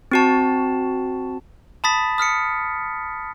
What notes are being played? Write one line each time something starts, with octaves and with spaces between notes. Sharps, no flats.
C4 F#4 A5
A5 B5 D#6 A6 B6
D#6 F6 B6 C#7